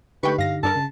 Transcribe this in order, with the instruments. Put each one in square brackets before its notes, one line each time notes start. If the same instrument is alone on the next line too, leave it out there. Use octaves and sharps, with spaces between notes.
[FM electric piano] D3 D#4 G4 [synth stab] A3 G5 C#6 [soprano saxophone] B4
[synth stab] G2 A#6 [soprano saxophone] F5
[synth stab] G2 D4 A#4 [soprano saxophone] A5
[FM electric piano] C#3